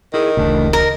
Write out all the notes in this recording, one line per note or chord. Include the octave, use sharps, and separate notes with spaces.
D#3 E4 G#4
D1 A1 C#3 A3 D4
A#4 D#5